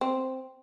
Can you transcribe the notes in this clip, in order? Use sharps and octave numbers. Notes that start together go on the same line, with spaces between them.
C4